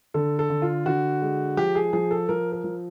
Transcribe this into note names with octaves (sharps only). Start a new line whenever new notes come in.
D3 A4
A4
D3
F4
D3 F#4
G#3
F3 G4
G#4
F3 G#4
A4
F3 A#4
A#4
F3